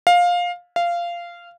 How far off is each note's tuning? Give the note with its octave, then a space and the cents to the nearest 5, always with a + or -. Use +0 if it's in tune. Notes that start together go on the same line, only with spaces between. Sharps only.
F5 +15
F5 -15